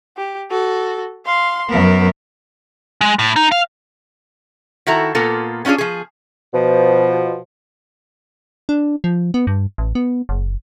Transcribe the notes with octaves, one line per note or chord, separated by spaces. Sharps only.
G4
F#4 A4
F5 C6
F#2 B3 A#4
G#3
A2
D#4
F5
D#3 E4 F#4 A4 A#5
A#2 A#3 B3 F4 A4
B3 C#4 D4 F4 G#4
F3 G#4
B2 F3
D4
F3
B3
G2
A1
B3
F#1